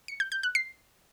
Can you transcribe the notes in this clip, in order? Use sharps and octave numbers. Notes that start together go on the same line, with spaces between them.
C#7
G6
G6
F#6
C7